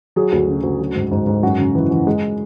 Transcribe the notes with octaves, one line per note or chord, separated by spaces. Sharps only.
F#3 G#4
D2
C#3
D2
F#3
G#2
G#2
G#2
F#2 F#4
C#3
E3
E3
G#3